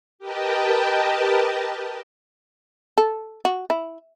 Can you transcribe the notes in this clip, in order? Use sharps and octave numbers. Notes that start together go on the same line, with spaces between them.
G4 A#4 B4 D#5 G5 A5
A4
F#4
E4